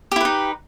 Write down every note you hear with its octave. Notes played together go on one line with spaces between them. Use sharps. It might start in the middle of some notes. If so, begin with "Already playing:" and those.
D#4 E4 G4 B4